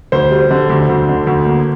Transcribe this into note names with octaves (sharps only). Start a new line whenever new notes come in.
D2 C5
G3
D3
D2
D2
D3
D2
A#3